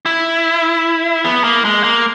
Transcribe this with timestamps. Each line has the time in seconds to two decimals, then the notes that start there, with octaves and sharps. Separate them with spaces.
0.06 E4
1.25 B3
1.44 A#3
1.65 G#3
1.84 A#3